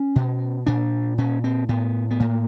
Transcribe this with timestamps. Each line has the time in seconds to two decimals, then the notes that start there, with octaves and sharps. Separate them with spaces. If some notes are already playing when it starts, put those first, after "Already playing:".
Already playing: C#4
0.16 B2
0.66 A#2 D4
1.18 A#2 C#4
1.44 C4
1.69 A2 B3
2.11 B3
2.20 A2 A#3